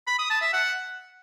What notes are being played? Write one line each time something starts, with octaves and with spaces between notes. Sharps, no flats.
B5
D#6
A5
E5
F#5